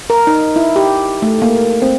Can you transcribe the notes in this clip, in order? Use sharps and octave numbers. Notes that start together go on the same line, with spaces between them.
A#4
D#4
E4
G4
A3
A#3
C4